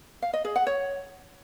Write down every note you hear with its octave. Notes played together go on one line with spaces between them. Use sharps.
F5
D#5
G#4
F#5
C#5